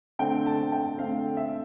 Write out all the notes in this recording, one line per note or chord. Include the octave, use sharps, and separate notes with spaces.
D3 A3 C4 G5
A5
G5
D3 A3 C4 F5
E5